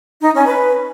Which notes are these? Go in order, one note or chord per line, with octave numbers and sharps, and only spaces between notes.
D#4
C#4
B4